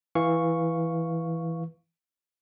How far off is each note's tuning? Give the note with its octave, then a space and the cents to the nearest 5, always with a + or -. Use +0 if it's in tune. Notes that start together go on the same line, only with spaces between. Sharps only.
E3 +0 F5 +0 C#6 +0